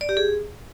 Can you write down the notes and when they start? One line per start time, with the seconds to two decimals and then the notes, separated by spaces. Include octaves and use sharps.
0.01 D5
0.09 G4
0.17 G#4